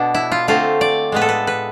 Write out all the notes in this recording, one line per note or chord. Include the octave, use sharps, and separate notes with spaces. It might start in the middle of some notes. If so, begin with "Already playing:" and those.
Already playing: B2 B3 D4
E4
F4
D3 A3 C4 F4
D5
A2 G#3 B3 B4
A4
B4
B4